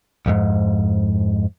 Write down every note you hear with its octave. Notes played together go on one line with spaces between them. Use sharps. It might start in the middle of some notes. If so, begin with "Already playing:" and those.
B1 F2 G#2